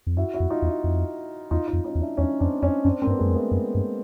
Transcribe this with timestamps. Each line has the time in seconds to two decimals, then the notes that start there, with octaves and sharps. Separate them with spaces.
0.07 F2
0.17 F#2 E4 F#4
0.34 E4 F#4
0.40 F2
0.50 D#4 F4
0.62 E2
0.67 E4 F#4
0.84 F2
1.51 E2 D#4 F4
1.67 D#4 F4
1.73 F2
1.84 C#4 D#4
1.95 E2
2.01 D4 E4
2.17 E2 C#4 D#4
2.40 F2 C4 D4
2.62 F2 C#4 D#4
2.85 F#2 C4 D4
3.02 A#3 C4
3.07 G2
3.11 B3
3.18 F#2 G#3 A#3
3.29 F2 A#3
3.35 A3 B3
3.51 F#2
3.75 G2